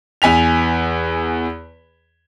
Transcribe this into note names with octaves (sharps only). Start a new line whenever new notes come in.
E2 G#5 B6 F7